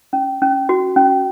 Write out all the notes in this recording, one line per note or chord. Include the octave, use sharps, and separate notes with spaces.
C#4
C#4
F#4
C#4